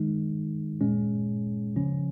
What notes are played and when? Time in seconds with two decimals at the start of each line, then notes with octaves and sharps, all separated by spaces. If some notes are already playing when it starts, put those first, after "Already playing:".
Already playing: D#3 G#3 D#4
0.80 A#2 G#3 C#4
1.76 C#3 F3 C#4